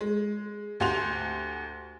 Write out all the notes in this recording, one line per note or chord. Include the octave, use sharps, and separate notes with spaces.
G#3
D2 G4 F#5 G#5 C6 F7